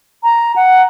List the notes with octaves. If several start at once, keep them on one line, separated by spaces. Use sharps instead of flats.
A#5
F#5